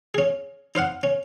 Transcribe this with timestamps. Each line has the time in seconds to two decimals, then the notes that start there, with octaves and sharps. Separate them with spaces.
0.14 C#4 G#4
0.75 D#4 C5 F5 F#5
1.03 C#4